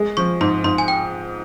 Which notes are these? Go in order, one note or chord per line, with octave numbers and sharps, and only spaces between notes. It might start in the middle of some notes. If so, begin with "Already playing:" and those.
Already playing: G#3
F3 C#6
G#2 C6
G#2 C6
G#5
G5